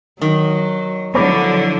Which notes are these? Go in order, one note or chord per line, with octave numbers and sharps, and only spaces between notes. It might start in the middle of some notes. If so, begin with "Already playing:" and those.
D#3 F#3
D3 F3 F#3 E4 C#5 B5 D6